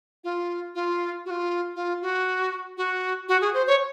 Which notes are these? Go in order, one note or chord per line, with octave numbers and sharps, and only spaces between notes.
F4
F4
F#4
F4
F4
F#4
F#4
F#4
G#4
C5
C#5